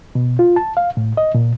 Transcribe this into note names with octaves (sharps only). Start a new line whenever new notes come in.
B2
F4
A5
F5
A2
D#5
A#2